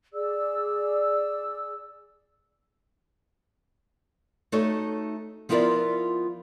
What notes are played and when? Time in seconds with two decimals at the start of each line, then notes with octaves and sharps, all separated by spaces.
0.13 G#4 D5 E6
4.52 A3 D#4 F#4 A4 C#5
5.49 F3 B3 E4 F4 A#4 D5